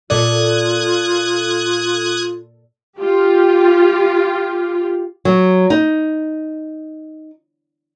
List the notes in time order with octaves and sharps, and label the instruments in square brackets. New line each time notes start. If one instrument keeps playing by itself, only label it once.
[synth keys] A#2 A4 [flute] F4 [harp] D5 [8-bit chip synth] D#6 F#6 G#6
[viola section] F4 G4
[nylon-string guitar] F#3
D#4